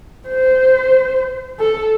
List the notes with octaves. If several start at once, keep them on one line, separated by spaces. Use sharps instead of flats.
C5
A4